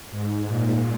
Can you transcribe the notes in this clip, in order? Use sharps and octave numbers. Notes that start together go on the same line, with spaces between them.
G#2
A#2